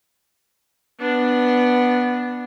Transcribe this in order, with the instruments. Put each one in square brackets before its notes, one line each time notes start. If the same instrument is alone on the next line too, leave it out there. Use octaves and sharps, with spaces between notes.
[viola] B3 D4